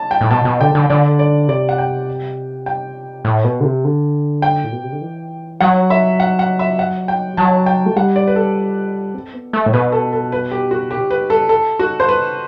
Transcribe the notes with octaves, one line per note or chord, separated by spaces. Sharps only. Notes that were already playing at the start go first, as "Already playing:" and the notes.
Already playing: A5
G5
A2
B2 A5
B2
D3 G5
D3
D3 D5
D5
C3 D5
F#5
G5
G5
A2
B2
D3
C3
D3
G5
A2
B2
C3
D3
E3
F#3 F#5
E5
F#5
F#5
E5
F#5
G5
F#3 A5
G5
A3
G3 F#5
D5
B4
A4
C4
B3
A3
A2
B2 B4
A4
A4
B4
G4
F#4
G4
B4
A4
A4
F#4
C5
B4